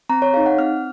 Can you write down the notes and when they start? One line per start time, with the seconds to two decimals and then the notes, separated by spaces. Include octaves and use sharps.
0.09 C4 A#5
0.22 C#5
0.33 D#4 G#4 F5
0.46 F#5
0.59 C4 F6